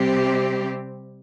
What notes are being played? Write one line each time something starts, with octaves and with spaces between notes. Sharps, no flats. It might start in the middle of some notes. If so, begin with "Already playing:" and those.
Already playing: C3 G3 C4 G4